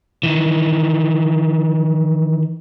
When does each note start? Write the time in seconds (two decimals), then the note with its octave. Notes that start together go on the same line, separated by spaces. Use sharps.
0.23 D#3 E3